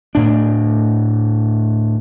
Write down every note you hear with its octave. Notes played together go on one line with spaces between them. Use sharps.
D2 A2 D4